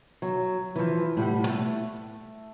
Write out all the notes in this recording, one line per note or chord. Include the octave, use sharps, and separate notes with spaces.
F#3
E3 F3
A2 G3 F#5
A3